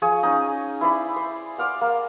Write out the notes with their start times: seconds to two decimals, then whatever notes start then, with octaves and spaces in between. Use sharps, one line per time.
0.02 F3 G#4 G#5 C#6
0.23 C#4 D#4
0.81 E4 C5 D5 B5
1.16 C5
1.58 C5 D5 F5 F#5
1.81 A#3